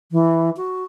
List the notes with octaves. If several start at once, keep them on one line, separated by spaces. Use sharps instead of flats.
E3
F#4